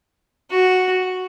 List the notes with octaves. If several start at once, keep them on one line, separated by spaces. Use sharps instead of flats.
F#4